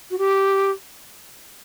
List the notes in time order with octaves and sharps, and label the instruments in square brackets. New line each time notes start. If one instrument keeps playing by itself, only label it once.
[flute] F#4
G4